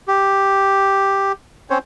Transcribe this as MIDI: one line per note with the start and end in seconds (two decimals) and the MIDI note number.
0.08 1.32 67
1.70 1.78 60
1.70 1.78 61
1.70 1.78 72
1.70 1.78 73